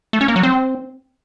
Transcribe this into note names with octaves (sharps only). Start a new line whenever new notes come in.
A3
C#4
A#3
F#3
C4